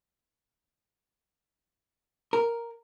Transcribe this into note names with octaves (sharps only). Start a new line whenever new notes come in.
A#4